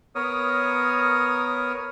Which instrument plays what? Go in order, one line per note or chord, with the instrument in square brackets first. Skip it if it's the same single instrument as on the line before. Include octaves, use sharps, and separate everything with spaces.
[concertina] B3 A#4 C#5 D#6